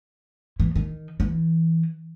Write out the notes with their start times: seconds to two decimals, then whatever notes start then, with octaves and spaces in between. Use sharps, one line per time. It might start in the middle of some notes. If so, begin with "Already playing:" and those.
0.60 E3
0.76 D#3
1.20 E3